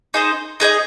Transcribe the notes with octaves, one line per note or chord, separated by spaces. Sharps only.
D#4 G#4 C5 D#5
D#4 G#4 C5 D#5